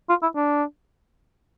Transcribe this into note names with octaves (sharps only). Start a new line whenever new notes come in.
F4
E4
D4